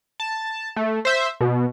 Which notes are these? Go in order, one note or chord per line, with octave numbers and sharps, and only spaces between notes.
A5
A3
C5 E5
B2